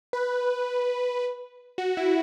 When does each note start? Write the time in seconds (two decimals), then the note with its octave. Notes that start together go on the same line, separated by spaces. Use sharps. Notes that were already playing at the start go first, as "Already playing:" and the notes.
0.13 B4
1.78 F#4
1.97 E4